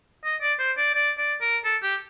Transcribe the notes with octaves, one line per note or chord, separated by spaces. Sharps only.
D#5
D5
C5
D5
D5
D5
A#4
A4
G4